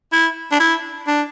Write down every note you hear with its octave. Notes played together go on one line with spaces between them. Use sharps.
E4
D4
E4
D4